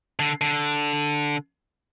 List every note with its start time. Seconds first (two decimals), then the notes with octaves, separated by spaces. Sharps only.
0.19 D3
0.41 D3